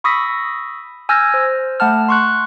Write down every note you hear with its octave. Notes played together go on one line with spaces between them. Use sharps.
B5 C#6 D#6 E6 A#6 B6
G#5 E6 F6 G6 G#6 A#6
C5
A3 F#5 A5 F6
C6 C#6 F#6